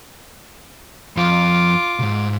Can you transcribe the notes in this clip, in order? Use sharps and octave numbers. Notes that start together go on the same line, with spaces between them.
F2 F3 F4 D6
C2 G#2